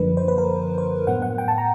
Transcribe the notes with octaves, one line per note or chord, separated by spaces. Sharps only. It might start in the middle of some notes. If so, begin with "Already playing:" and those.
Already playing: F#2 D3 F3 A#3 D4 B4
C5
B4
A#4
C5
A2 F#3 B3 F#5
F#5
G5
A5
A#5